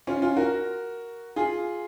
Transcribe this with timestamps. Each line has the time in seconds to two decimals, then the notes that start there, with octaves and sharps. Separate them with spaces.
0.07 C#4 F4
0.22 C#4 F4
0.36 F#4 A#4
1.36 F4 G#4